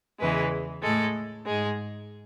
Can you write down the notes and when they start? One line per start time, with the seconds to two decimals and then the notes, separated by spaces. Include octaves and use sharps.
0.20 E2 C#3 E3 G#3 B4
0.83 A2 G#3 A4
1.45 G#2 G#3 G#4